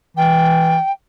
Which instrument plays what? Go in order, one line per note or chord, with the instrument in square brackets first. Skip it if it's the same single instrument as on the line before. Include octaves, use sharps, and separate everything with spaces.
[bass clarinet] E3 [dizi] G5